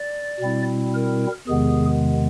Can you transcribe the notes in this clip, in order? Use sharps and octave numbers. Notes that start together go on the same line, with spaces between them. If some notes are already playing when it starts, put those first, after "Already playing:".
Already playing: D5
B2 G3 C4 E4
A#4
E2 C3 D#3 G#3 B3 G#4